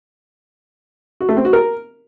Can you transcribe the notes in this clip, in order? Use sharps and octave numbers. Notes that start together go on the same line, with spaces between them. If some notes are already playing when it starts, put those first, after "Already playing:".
F#4
A3
C4
F#4
A#4